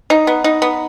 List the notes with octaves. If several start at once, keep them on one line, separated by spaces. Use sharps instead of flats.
D#4
B3
D#4
B3